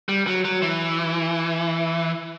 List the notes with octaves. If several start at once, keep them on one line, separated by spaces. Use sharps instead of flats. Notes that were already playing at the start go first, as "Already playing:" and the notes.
G3
F#3
F#3
E3